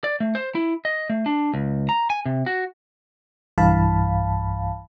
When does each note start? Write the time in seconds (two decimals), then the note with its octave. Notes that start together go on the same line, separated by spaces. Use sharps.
0.04 D5
0.20 A3
0.35 C5
0.55 E4
0.85 D#5
1.10 A3
1.26 D4
1.54 C#2
1.89 A#5
2.10 G#5
2.26 C3
2.46 F#4
3.58 B1 G2 E3 F5 A5 B5